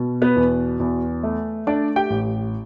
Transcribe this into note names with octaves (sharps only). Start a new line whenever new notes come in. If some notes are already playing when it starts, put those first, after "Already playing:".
Already playing: B2
B3 B4
E2
E2
A3
A3 D4 D5
G4 G5
A1